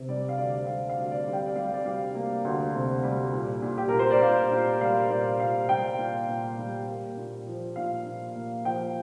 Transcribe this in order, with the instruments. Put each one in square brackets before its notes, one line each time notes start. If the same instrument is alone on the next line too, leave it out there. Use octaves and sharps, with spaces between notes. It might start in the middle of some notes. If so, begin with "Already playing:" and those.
Already playing: [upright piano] C3
G3 D5
F5
D2 D5
G3 F5
F5
D2
D5
G3
G5
D5
G3 F5
D5
G3 F5
A#3
D2
C3
G3
A#2
A#2
G4
A#2 A#4
C5
D5
A#2 F5
A#2
G3 F5
A#2 D5
A#2 F5
G3 G5
A#2
A#2
G3
A#3
A#2
F3
A#2 F5
A#2
A#3
F3 G5